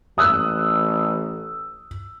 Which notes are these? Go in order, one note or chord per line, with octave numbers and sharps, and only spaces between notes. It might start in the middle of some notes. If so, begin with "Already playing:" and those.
A1 D#6 E6 F#6